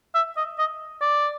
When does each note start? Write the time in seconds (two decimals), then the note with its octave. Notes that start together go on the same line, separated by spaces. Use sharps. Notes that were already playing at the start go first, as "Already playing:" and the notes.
0.15 E5
0.37 D#5
0.59 D#5
1.02 D5